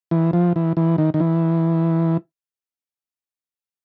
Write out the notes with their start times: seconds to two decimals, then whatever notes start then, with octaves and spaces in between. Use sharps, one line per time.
0.11 E3
0.33 F3
0.56 E3
0.77 E3
0.98 D#3
1.14 D#3
1.20 E3